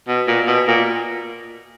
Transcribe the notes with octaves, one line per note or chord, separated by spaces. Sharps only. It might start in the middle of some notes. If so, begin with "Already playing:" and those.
B2
A#2
B2
A#2